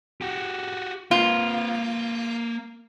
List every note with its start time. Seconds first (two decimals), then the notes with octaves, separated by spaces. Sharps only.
0.21 F#4 G4
1.11 A#3 F4 B4